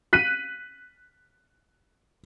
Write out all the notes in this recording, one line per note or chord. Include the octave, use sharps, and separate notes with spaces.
F#6 B6 D#7